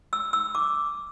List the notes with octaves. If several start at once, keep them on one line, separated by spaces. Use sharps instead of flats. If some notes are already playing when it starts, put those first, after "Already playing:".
E6
E6
D6